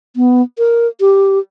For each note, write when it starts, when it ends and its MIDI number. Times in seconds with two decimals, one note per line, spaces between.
0.16 0.42 59
0.58 0.87 70
1.00 1.39 67